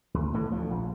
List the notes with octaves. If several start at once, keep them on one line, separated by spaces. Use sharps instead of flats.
D2
C2 A2 E3 A3
D2 F3
A#1